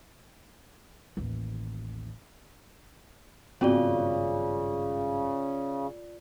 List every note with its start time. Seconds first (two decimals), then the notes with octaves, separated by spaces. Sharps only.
1.17 A1 D#2
3.61 G#1 G2 C#3 B3 C4 F4 F#4 D5